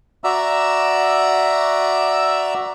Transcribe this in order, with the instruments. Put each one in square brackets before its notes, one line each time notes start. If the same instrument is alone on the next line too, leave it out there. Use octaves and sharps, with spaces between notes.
[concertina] F#4 D5 E5 A#5 E6